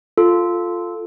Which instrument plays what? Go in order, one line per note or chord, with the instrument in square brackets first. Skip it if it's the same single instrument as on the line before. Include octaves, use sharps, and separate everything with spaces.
[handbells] F4 A4